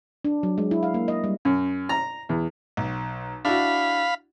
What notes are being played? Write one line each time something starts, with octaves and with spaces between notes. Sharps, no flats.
D4
F#3
G#3
E4
F5
A#3
D#5
G3
F#2
A#5
E2
B1
D4 E4 F#4 F5 B5